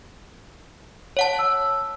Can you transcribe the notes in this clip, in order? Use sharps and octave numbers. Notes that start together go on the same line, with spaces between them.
C#5 F#5 A5
E6